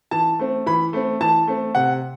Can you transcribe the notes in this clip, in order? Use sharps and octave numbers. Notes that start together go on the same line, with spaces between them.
E3 A5
A3 C4
E3 B5
A3 C4
E3 A5
A3 C4
C3 F#5